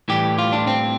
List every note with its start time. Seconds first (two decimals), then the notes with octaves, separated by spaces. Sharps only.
0.08 A2 E3 G3 G4
0.39 F4
0.53 D4
0.67 C4